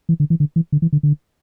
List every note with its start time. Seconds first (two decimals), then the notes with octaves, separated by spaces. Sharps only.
0.09 E3
0.20 D3
0.30 E3
0.40 D3
0.56 E3
0.72 D3
0.82 E3
0.93 D3
1.03 D3